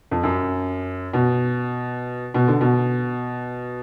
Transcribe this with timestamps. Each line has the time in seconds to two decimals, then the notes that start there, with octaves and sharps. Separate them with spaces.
0.11 F2
0.23 F#2
1.13 B2
2.34 B2
2.48 D3
2.61 B2